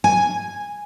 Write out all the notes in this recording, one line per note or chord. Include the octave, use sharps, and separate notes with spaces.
G#5